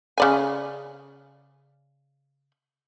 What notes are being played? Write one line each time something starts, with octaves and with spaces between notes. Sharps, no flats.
C#3 D5 G#5